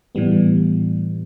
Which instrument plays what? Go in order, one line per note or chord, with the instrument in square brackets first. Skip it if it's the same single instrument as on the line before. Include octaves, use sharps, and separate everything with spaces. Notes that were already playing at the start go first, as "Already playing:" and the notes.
[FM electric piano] A2 E3 G3 B3